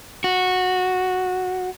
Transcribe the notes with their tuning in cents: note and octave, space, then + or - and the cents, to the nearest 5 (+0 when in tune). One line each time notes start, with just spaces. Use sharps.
F#4 -10